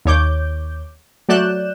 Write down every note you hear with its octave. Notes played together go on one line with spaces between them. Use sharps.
D#2 C#5 D6 G6
F#3 A3 D5 F#6 G6 E7